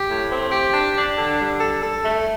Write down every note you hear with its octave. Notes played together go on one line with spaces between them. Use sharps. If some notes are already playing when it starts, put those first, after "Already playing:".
Already playing: G4
A2
C4
G4
D4
D4
D3
G3
A4
A4
A3